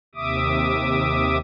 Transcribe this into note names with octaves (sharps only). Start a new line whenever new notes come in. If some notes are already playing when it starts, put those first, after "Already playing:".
D#2 C3 E5 D6 D#6